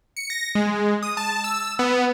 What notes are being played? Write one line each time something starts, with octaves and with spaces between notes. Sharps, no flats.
C#7
A#6
G#3
D#6
A5
E6
B3